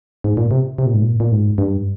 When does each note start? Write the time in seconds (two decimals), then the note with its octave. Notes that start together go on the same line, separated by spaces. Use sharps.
0.24 G#2
0.37 A#2
0.51 C3
0.78 C3
0.86 A#2
0.94 G#2
1.01 A#2
1.20 A#2
1.32 G#2
1.58 G2